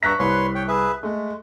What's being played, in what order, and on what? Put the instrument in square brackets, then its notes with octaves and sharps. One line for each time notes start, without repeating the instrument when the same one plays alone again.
[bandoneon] G2 E5 A#5 [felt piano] C#6 F#6 B6
[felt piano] C2 [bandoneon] B4 C#5 C6
[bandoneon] C#5 G5
G#4 B4 E5
[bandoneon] G#3 [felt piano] A3